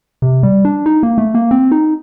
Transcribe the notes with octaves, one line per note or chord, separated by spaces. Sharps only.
C3
G3
D4
D#4
A#3
A3
A#3
C4
D#4